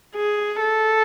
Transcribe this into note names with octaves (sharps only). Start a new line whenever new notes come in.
G#4
A4